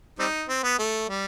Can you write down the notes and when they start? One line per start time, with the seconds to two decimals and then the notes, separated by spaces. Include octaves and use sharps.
0.19 G3 C4 D#4
0.49 C4
0.63 B3
0.79 A3
1.09 G3